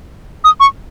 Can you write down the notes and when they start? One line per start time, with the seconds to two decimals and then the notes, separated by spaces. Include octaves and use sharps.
0.44 D#6
0.60 C#6